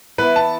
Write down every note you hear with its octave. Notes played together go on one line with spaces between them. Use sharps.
E3 B3 E4 B4
A5